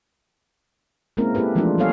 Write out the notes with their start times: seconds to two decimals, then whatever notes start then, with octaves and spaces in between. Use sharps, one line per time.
1.17 G#3 A#3 C4 C#4 E4 A#4
1.35 A#3 E4 G4 A4 B4
1.55 E3 F3 G#3 A3 D4 F4
1.78 G3 B3 G#4 A4 C#5 F5